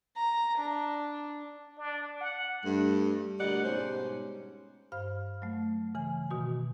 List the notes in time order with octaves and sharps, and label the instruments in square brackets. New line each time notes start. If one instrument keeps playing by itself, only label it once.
[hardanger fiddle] A#5
D4
[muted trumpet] D4
F#5
[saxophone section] G2 A3
D2 A#2 G3 D5 D#5 F#5
G#2 B2 G3 C#4 C5
[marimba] G2 C5 F5 F6
F#3 A3
C#3 E3 G#5
B2 D#3 F#4